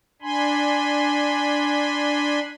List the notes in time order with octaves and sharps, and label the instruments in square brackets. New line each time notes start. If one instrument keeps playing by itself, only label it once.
[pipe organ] D4 G#5 B5 C6